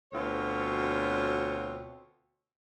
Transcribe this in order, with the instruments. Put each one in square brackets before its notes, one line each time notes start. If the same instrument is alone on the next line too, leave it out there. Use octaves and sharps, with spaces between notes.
[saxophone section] D2 B2 C4 F4 C#5